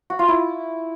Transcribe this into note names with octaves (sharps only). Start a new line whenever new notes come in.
F#4
F4
E4